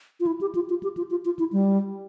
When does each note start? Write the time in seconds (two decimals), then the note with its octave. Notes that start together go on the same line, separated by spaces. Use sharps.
0.20 F4
0.27 E4
0.41 G4
0.55 F4
0.70 F4
0.83 G4
0.97 F4
1.10 F4
1.25 F4
1.39 E4
1.53 G3